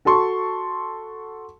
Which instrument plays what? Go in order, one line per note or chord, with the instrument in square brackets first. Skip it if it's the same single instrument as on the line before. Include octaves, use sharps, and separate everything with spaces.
[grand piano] F#4 A4 A5 C6 C#6